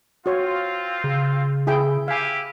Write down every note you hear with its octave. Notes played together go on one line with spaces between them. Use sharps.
C4 F4 F#4 C#5
C#3
E4 G#4 G5
E4 G4 F5 G#5